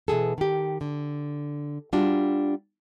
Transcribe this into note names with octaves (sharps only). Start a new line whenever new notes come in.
B2 E3 G#4 A4
D#3 G4
D3
G3 D4 F4 F#4